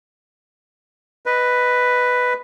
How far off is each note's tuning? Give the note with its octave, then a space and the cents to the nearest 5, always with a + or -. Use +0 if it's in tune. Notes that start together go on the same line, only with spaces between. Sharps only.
B4 +5 D#5 +0